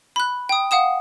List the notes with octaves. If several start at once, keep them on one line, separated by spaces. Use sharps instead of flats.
B5 F#6
G5 D#6
F5 F#5 D#6 E7